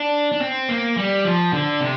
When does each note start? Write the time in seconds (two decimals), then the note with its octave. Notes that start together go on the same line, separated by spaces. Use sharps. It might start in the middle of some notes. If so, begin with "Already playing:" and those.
Already playing: D4
0.32 D4
0.41 C4
0.69 A#3
0.97 G3
1.25 F3
1.53 D3
1.81 C3